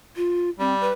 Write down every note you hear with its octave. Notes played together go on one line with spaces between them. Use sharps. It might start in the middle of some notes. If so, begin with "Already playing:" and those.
F4
G3 C4
B4